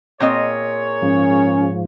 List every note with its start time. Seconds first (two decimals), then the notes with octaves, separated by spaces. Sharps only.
0.20 A#2 C4 G#4 A#4 C#5 D#5
1.02 G#2 F3 C#4